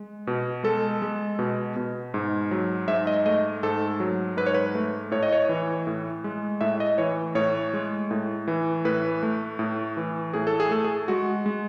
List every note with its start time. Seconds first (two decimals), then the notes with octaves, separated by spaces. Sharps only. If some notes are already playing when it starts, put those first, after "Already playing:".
Already playing: G#3
0.27 B2
0.64 G#3 A4
1.02 G#3
1.39 B2
1.76 B2
2.14 G#2
2.51 F#3
2.88 G#2 E5
3.07 D#5
3.26 A3 D#5
3.63 G#2 A4
4.00 F#3
4.37 G#2 B4
4.46 C#5
4.54 B4
4.75 A3
5.11 A2 C#5
5.23 D#5
5.33 C#5
5.49 E3
5.87 A2
6.24 G#3
6.61 A2 E5
6.80 D#5
6.98 E3 C#5
7.35 A2 C#5
7.74 G#3
8.11 A2
8.47 E3
8.85 A2 B4
9.23 A3
9.59 A2
9.97 E3
10.33 A2 G#4
10.47 A4
10.60 G#4
10.71 A3 A4
10.84 G#4
11.08 G#3 F#4
11.46 G#3